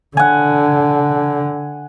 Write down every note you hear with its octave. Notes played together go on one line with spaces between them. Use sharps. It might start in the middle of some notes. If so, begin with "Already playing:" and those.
D3 F#5 G#5